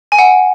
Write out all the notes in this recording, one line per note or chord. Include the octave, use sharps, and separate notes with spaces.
G#5
F#5